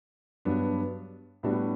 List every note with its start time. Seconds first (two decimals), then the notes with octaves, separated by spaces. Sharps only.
0.45 G2 F#3 B3 D4
1.43 A2 G3 B3 D4 F#4